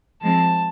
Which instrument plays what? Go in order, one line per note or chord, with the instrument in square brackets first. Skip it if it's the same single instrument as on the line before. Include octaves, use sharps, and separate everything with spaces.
[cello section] F3 G#3 C4 [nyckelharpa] A5